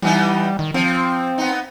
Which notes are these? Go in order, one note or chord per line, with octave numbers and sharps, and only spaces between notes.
E3 G3 B3 D#4
D#3
F3 C4
B3 D#4